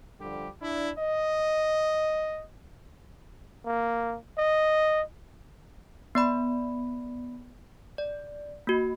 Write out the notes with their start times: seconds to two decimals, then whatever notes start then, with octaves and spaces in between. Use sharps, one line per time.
0.20 D3 F3 G3 G4
0.62 D4 E4
0.98 D#5
3.66 A#3
4.38 D#5
6.15 B3 D5 B5
7.98 D5
8.67 A#3 F#4